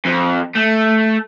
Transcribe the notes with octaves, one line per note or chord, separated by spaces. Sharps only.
F2
A3